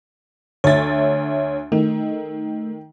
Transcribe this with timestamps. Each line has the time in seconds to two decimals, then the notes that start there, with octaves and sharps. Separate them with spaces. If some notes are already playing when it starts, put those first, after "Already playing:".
0.64 D2 C#5 E5 A6
1.72 D#3 A3